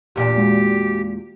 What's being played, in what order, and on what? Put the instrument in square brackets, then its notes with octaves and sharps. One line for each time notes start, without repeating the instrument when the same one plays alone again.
[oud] E2 A#2 D4 [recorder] G4
[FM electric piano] G#3 F#4